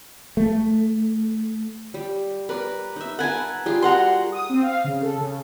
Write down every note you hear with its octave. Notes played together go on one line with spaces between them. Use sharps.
A3
G3
A#4 B4 D5
D#4 E5
A#4 B4 F#5 G#5 A5
G3 F4 G#4
F#4 A#4 F#5 A#5 C6
D#6
C4
F5
C#3
A4
C#3